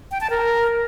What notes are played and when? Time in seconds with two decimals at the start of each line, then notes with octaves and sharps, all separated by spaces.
0.11 G5
0.21 A5
0.30 A#4